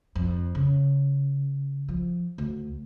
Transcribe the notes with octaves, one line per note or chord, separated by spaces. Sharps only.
F2
C#3
F3
D2